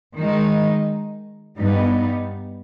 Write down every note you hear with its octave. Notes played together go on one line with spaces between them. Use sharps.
D#3 G#3 D#4
G2 G3 B3 D#4